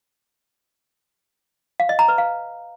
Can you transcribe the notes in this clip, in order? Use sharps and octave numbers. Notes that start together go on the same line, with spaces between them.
F5
D#5
A#5
B4
F5